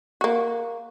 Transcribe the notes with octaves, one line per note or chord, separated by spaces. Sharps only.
A#3 F#4